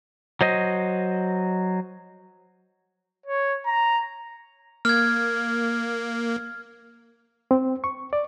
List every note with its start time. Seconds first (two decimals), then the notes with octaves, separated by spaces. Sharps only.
0.41 F#3 C5 D#5
3.26 C#5
3.66 A#5
4.85 A#3 F6 G#6
7.51 C4
7.84 C#6
8.13 D5